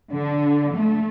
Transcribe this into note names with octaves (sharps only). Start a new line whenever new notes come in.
D3
A3